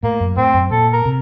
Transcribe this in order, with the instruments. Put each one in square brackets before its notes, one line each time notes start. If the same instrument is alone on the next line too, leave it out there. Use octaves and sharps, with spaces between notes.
[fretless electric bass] A2 [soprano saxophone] A#3
[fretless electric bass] F#2
[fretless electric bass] A2 [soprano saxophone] C4
[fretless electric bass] F#2
[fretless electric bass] A#2 [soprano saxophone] A4
[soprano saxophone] A#4
[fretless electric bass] C3